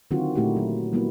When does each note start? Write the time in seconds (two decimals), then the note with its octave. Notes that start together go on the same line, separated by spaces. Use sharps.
0.11 D3 D#3 F#3 C4 F4 F#4
0.35 A#2 A3 D#4 E4 F#4 G4
0.56 F#3
0.93 F#3 G3 A#3 B3 E4 F#4